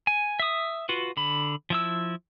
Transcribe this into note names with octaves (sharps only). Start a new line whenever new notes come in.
G#5
E5 D#6
F4 F#4 B4
D3 B5
F3 E4 E6